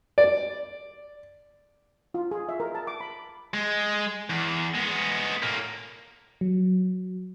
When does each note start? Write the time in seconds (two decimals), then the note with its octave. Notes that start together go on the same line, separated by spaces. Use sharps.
0.18 D5
2.14 F4
2.31 G#4
2.49 E5
2.60 A#4
2.75 A5
2.87 D6
3.00 B5
3.54 G#3
4.30 E2
4.75 G#3 B3
5.43 A2 A#3
6.41 F#3